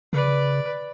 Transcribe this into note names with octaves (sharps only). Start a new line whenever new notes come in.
C#3 B4 D5